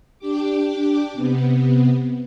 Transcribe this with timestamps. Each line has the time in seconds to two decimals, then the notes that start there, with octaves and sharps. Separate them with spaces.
0.19 D4 G4 D6
1.13 C3 B3